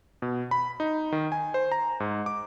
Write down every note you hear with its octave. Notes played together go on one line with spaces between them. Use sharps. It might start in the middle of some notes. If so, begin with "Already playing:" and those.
B2
B5
D#4
D#3
G#5
C5
A#5
G#2
D6